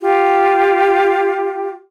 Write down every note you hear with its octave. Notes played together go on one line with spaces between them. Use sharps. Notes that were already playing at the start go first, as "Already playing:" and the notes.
F4 G4